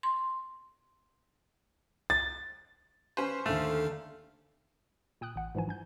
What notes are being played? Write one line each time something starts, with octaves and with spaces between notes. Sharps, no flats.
C6
A6
C#4 B4 C5
D#2 D3 D#3 A3 A4 F5
A#2 G5 D#6 F#6
A1 F#5
G#2 E3 F3 G#5
G2 G#5 G6